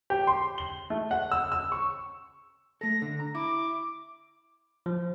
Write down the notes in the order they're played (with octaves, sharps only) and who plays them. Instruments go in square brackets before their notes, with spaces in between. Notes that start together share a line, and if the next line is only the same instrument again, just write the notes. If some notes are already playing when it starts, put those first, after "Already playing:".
[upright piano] G4
C6
G7
A3
F#5
E6
E6
C#6
[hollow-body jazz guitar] A3 A4 [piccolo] A#6
[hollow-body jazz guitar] D3
A#5
[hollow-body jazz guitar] E4 [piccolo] D6
[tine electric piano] F3